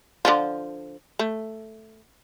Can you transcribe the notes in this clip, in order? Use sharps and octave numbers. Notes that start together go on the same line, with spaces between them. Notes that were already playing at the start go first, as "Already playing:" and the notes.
D3 F3 F4
A3